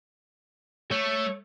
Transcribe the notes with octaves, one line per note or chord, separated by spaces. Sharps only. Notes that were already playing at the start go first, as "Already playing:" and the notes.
A3 C#5